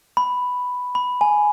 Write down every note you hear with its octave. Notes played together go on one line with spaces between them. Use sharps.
B5
B5
G#5